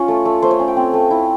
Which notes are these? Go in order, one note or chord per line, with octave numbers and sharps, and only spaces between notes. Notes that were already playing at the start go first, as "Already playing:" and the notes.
Already playing: C#4 F4 C#5
A3
A3
A3 C5
C#5
C#4
G5
C4
A3
E4